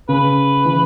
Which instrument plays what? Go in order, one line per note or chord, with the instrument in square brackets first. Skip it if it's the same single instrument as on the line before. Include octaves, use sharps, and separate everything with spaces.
[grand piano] C#3 [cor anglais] B4
[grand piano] E3